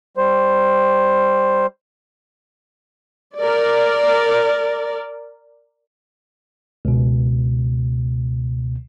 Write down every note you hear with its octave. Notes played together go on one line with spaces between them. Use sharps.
G3 C5
A#4 D5
C#2 B2